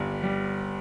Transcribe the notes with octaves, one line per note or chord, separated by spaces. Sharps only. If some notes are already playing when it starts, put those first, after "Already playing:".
Already playing: G1 G3
G3